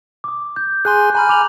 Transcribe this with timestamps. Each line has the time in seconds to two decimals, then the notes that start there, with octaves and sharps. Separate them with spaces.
0.24 D6 D#6
0.56 G6
0.85 G#4 G#5 C6 F#6
1.15 G#5 A#5 B5 F6
1.29 D6 F7 F#7